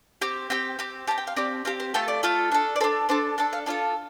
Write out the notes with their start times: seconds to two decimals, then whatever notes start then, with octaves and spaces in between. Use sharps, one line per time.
0.21 C4 G4
0.50 C4 G4 G5
0.79 C4 G4
1.07 C4 G4 A5
1.18 G5
1.27 F5
1.37 C4 G4 D5
1.65 C4 G4 F5
1.80 C5
1.94 A3 F4 A4 G5
2.08 D5
2.23 A3 F4 A4
2.52 D4 A4
2.76 D5
2.81 A4 C5
2.84 D4
3.09 D4 A4 C5
3.38 D4 A4 A5
3.53 F5
3.66 D4 F4 A4 D5